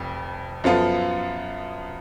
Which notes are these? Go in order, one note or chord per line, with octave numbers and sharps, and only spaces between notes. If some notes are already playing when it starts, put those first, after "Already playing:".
Already playing: F1 F2
F#2 F3 B3 F4 A4